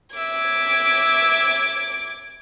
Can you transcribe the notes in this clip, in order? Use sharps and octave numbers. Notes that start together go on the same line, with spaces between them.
E5 D6 G#6